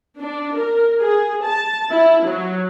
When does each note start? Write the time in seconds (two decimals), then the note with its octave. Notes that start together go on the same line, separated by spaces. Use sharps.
0.19 D4
0.58 A#4
1.01 G#4
1.46 A5
1.92 E4
2.27 F#3